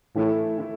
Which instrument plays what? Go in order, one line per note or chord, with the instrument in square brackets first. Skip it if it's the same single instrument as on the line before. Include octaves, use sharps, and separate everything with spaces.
[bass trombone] A2 [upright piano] E3 A3 E4 A4
[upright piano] E3 A3 E4